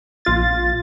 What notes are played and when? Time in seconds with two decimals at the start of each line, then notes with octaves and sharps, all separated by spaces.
0.25 A#1 F4 A6